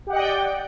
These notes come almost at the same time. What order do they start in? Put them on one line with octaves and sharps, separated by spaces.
G4 F#5 D#5 G5 D5